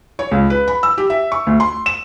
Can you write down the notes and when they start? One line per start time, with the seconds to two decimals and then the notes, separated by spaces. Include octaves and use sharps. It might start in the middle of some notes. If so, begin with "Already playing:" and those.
0.19 C#5
0.31 C#2
0.50 B4
0.68 B5
0.83 E6
0.98 G4
1.10 E5
1.32 C#6
1.47 D2
1.60 C6
1.86 E7